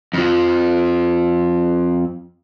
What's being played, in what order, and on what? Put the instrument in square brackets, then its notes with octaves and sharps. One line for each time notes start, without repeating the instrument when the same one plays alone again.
[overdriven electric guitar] F2 F3